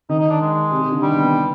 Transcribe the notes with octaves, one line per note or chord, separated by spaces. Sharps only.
D#3 D#4
D#4
D4
G#3
C3
C3
D3
D#3 G3
B3
B3